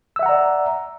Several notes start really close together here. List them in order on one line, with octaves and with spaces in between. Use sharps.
E6 E5 F#5 A#5 D5